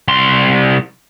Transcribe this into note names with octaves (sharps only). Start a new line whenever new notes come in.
C2 C6